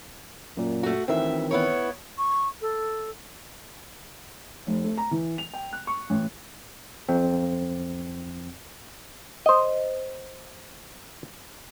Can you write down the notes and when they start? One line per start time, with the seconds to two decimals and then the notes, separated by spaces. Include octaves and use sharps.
0.57 F#2 A#2
0.83 A3 F#4
1.08 D2 D#3 E3 C4 E5
1.51 B3 E4 C#5
2.18 C#6
2.61 A4
4.67 F1
4.84 A3
4.97 A#5
5.11 E3
5.38 F7
5.53 G5
5.73 F#6
5.87 C#6
6.10 A1
7.09 F2 C4
9.46 C5 D#5